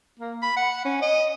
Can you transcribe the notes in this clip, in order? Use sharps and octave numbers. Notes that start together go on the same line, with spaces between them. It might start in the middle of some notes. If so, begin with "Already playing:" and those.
A#3
B5
F#5
C#4
D#5